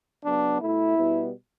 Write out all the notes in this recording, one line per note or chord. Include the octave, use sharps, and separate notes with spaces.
C#3 F#3 B3 D4
B2 A3 E4
B2 G3 B3